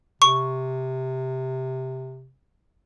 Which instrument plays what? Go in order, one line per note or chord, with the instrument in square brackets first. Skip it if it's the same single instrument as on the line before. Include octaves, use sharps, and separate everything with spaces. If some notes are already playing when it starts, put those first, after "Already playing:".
[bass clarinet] C3 [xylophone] C#6